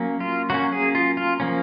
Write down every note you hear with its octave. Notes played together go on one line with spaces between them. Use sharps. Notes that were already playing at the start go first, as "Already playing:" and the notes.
Already playing: F#3 A#3 C#4
F4
F#3 A#3 C#4 F#4
G#4
F4
F4
F3 A#3 C#4